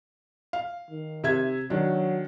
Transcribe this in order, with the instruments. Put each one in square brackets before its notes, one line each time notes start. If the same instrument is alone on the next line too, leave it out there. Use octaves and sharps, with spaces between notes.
[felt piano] F5
[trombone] D#3
[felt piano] C3 E5 G#6
[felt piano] D#3 D4 [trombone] F#3